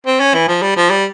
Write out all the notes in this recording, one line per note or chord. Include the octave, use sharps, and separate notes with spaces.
C4
C#4
E3
F3
G3
F3
G3